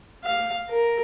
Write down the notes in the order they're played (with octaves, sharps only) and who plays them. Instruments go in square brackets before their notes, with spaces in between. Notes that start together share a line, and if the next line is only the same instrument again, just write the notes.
[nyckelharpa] F5
A#4